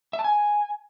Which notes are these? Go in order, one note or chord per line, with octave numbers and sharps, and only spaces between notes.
E5
A5
G#5